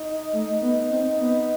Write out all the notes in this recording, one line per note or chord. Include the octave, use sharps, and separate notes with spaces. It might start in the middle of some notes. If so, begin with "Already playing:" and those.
Already playing: D#4
A3
B3
C4
B3